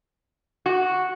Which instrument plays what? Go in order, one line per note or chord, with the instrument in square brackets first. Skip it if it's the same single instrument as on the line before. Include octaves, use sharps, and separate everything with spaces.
[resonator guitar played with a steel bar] F#4